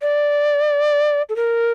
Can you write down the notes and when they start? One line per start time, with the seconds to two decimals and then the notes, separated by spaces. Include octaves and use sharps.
0.02 D5
1.29 A4
1.36 A#4